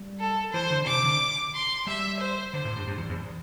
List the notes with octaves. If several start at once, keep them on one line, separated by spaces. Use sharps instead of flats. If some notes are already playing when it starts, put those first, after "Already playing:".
Already playing: G3
A4
E3 C5
D3
C3 D6
D3
C6
G3 E5
C5
D3 C5
A2
G2
G2
E2
E2